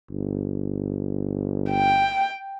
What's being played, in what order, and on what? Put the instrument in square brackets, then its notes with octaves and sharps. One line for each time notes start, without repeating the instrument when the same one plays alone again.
[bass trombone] G1
[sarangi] G5